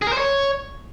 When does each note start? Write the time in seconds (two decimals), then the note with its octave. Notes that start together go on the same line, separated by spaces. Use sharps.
0.02 G#4
0.07 A#4
0.12 C5
0.18 C#5